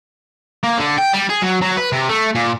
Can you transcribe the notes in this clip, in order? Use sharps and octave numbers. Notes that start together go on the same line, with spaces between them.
A#3
D3
G5
G3
G#4
F#3
F#3
B4
C3
A3
A#2